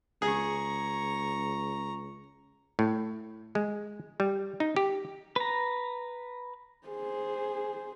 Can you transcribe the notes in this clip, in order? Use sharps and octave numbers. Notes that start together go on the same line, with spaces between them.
C#2 G#4 A#5 C#6
A2
G#3
G3
D#4
G4
B4 A#5
G#4 C5